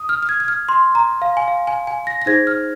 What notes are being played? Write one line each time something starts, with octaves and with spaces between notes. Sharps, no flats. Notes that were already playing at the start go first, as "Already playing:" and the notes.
Already playing: D#6
F6
F6
G#6
G#6
F6
C6
A#5
F5
G#5
F5
G#5
G#5
A#6
A#6
D#4 G#4 C5 G#6
F6